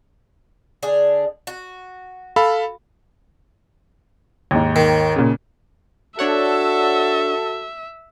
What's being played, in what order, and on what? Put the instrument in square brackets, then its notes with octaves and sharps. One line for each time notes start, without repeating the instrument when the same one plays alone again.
[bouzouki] D3 D4 G#4
F#4
[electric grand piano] A4 F5 B5
[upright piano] D#2 G#2
[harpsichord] D#3
[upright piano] A#2 C#3
[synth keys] D4 C#5 F#5 [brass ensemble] F#4 A4 [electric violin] E5